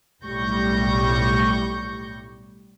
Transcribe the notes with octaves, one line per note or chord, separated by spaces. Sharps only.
B1 A2 G3 C#6 G6 A#6